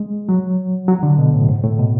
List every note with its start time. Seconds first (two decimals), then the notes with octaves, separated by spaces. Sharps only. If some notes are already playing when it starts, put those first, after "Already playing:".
Already playing: G#3
0.29 F#3
0.88 F#3
1.03 D3
1.18 B2
1.34 A2
1.49 G#2
1.63 A2
1.79 B2